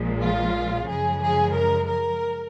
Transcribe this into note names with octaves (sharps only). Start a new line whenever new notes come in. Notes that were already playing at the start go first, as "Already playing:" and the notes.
Already playing: A#1 A#2 F3 G#3
F4
F#2 C#3 F3 G#3 G#4
G#4
A#4
A#4